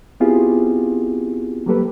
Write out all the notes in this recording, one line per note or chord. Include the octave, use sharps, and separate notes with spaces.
B3 C4 E4 F4 G4 G#4
F#3 G3 A#3 G4 A4 B4